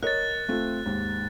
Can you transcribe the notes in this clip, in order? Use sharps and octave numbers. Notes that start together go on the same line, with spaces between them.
A#4 C#5 D#5 F#6 A6
A3 C4 F4
D#2 G#2